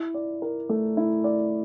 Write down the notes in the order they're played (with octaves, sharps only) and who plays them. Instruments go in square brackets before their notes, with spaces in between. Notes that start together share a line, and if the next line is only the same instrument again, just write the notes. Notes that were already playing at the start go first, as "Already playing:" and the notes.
Already playing: [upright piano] E4
D5
A#4
A3
E4
D5